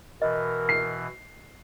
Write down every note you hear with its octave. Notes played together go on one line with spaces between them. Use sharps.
B2 E3 A#4 D#5
C7